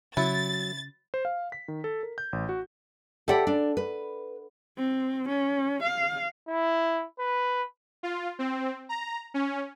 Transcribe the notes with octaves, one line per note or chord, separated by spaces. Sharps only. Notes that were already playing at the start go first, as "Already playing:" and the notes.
C#3 F#3 E4 A6
C5
F5
B6
D#3
A4
A#4
G6
A1
F#4
G4 A4 D5 E5 F#5 B5
D4
B4
C4
C#4
F5
E4
B4
F4
C4
A#5
C#4